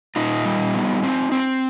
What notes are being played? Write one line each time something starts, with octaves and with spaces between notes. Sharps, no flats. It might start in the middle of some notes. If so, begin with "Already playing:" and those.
A#2 D#4 F4
G3
B3
C4
C4